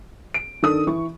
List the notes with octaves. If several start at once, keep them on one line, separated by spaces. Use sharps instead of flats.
D7
D#3 D4 A4 D#6
E3 C#6